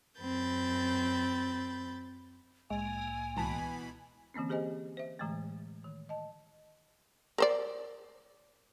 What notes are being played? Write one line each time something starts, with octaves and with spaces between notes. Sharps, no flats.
F#2 C4 B5 G6 A6
C2 A2 G#3 A#3 G#5
C#2 B2 E3 A5 B5
D3 E3 A#3 C4 C#4
G4 G#4 C5 D#5 G#5
C5 E5
A2 D3 E3 G#3 A3
D#3
D#5 A5
A#4 C5 D5